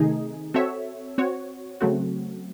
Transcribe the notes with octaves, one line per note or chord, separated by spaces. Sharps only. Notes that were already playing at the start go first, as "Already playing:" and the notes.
Already playing: C3 D#3 A3 D#4 G#4
C4 F#4 A4 C#5 E5
C4 F#4 C#5
C#3 F#3 A3 C4 F#4